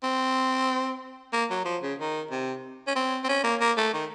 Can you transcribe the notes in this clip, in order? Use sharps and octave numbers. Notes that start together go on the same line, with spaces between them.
C4
A#3
F#3
F3
C#3
D#3
C3
C#4
C4
C4
C#4
A#3
A#3
A3
D#3